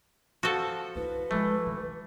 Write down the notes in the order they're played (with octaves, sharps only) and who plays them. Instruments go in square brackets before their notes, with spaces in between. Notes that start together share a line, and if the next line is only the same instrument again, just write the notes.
[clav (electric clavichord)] F3 [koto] F#4 A4
[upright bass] D4 E4 [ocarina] B4
[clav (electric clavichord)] E3 A3 [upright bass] F3 G#3
[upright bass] D#3